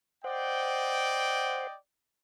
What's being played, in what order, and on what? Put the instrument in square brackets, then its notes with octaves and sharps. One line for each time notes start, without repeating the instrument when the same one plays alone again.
[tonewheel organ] C5 F#5 [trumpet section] D5 D#5 G5